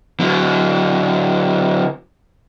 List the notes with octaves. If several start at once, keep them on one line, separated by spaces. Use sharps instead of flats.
D3 F#3